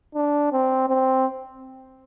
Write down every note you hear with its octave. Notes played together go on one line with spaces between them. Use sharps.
D4
C4
C4